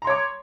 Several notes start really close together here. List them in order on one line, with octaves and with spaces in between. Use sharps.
A#5 C6 C#5 D6